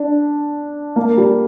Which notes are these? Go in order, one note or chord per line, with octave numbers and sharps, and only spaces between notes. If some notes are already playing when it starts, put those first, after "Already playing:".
Already playing: D4
A#3
G3